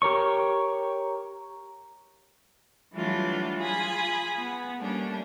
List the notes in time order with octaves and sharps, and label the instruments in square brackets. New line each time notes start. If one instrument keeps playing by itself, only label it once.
[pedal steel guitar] G4 A#4 C#5 C#6
[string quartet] E3 F#3 G3 A3 D4 F4
F4 G#4 G#5 B5 D#6
B3
G3 A3 A#3 C#4 D4